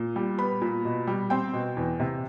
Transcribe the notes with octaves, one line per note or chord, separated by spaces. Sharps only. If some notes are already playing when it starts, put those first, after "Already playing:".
Already playing: A#2
G3
B3 B5
A#2
B2
G3
C4 G5
B2
E2
C3